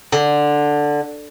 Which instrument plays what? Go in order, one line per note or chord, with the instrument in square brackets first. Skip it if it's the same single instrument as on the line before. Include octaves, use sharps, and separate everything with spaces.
[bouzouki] D3